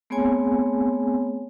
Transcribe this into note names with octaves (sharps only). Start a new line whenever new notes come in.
A3 B3 C4 G#4 C#5 G#5